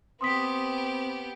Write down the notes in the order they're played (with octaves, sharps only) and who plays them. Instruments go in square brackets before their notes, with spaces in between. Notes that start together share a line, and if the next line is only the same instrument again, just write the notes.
[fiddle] B3 G4 [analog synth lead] C4 [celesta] C6 D#6 B6